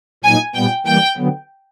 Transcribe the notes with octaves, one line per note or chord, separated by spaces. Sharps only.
A#2 F#3 A#3 D#4 G#5
A#2 G3 B3 G5
E3 G3 A#3 G5
D3 F#3 B3